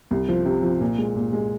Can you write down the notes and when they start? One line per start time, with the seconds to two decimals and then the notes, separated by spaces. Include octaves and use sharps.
0.11 C2
0.29 F3
0.46 C3
0.63 F3
0.81 A#2
0.98 G#3
1.16 A#2
1.33 G#3